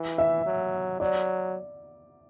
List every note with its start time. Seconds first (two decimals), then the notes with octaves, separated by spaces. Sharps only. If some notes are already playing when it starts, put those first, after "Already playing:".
Already playing: E3
0.18 E5
0.46 F#3
1.00 F#3 D5